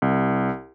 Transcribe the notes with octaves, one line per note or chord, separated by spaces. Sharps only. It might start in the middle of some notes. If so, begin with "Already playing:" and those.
C2